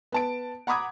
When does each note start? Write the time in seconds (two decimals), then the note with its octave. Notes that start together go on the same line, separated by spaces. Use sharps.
0.12 B3 A5 D7
0.67 F#5 A#5 B5 D6 D#6 G#6